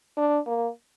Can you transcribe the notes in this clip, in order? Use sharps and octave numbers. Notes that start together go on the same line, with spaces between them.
D4
A#3